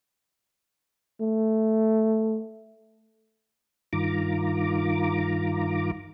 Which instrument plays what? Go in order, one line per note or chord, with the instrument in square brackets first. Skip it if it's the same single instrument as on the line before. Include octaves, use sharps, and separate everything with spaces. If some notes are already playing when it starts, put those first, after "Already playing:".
[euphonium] A3
[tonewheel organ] G2 D#3 F4 A#5 D6